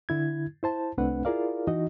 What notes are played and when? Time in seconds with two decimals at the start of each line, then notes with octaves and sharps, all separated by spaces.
0.09 D3 E4 G#6
0.63 E4 C5 A5
0.98 C2 A3 C4 D4 B4 F#5
1.25 E4 F4 G#4 A#4 D5 F5
1.67 E3 D#4 F#4 D#5